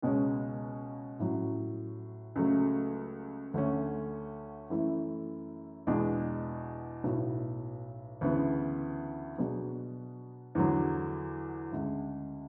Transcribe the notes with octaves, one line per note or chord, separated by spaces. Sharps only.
C#2 B2 G#3 C#4
A1 A2 F#3
C#2 C#3 F#3 A3
D2 D3 A3 C#4
F#2 E3 A3 E4
E2 B2 G#3 D4
B1 A2 F#3 B3 F#4
D2 C#3 E3 B3
B2 F#3 B3 D4 G#4
E2 D3 F#3
D2 C#3 G#3